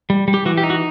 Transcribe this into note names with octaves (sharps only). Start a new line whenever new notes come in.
G3
G3
G4
E3 F#4
G4
D#4
F#4